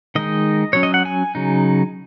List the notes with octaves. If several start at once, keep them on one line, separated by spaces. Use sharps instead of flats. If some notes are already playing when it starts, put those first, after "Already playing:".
D#3 G#3 D#4 D#5
F#3 C#4 C#5
D#5
F#5
G#5
C#3 F#3 D#4